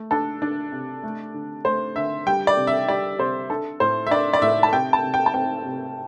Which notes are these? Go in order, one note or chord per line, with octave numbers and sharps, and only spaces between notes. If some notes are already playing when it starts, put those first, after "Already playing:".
Already playing: A3
D4 A4
D4
C3
A3
D3
A3 C5
D3 E5
G3 G5
D5
C3
E5
G3 D5
C3 C5
D4 A4
A2 C5
E5
D4 D5
D5
A2 E5
A5
C3 G5
A5
C3
G5
A5
C4 G5
C3